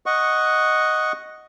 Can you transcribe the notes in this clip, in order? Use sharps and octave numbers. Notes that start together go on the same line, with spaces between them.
D#5 F#5 C#6